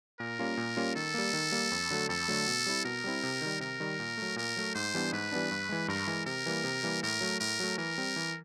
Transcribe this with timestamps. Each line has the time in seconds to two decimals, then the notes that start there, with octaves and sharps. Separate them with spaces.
0.20 A#2 A#4
0.39 G3 A#3 C#4 F4
0.57 A#2
0.77 G3 A#3 C#4 F4
0.95 D#3 A4
1.14 G3 A#3
1.33 D#3
1.52 G3 A#3
1.72 F2
1.90 D3 F#3 A3
2.09 F2 A4
2.28 D3 F#3 A3
2.47 B2
2.66 G3 C4 E4
2.85 B2 A#4
3.04 G3 C4 E4
3.23 C3
3.41 D#3 G3
3.60 C3 A#4
3.80 D#3 G3
4.00 A#2
4.17 F#3 A3
4.36 A#2 A#4
4.56 F#3 A3
4.75 G#2 C5
4.94 E3 G3 B3 D4
5.12 G#2 B4
5.32 E3 G3 B3 D4
5.51 G2
5.69 E3 G#3
5.88 G2 A#4
6.07 E3 G#3
6.26 C3 A#4
6.46 E3 G3 A#3
6.64 C3
6.83 E3 G3 A#3
7.03 A2 A#4
7.21 F#3 A3
7.40 A2 A#4
7.60 F#3 A3
7.78 E3 A#4
7.98 G3 C4
8.16 E3